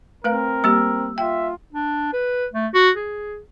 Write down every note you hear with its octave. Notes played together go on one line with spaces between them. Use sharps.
A3 C4 A#4 B4 F5
G3 A#3 G4 E6
F4 E5 G5
D4
B4
A3
F#4
G#4